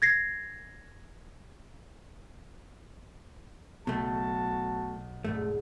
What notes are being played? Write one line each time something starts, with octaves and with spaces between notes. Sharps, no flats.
G#6 A#6 C7
B1 B2 A3 F#4 A5
D#1 G#2 A3